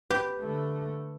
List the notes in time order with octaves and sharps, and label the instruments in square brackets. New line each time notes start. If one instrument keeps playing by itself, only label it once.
[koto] G4 [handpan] B4
[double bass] D3 A3